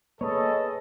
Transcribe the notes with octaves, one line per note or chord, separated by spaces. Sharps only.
A#3 G#4 A4 B4 C#5 D#5